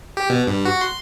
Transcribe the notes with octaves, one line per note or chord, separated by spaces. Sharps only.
G4
B2
G2
F#4
C6